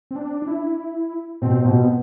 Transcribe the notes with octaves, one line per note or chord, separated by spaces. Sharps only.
C4
D4
D4
E4
B2 C4
B2
B3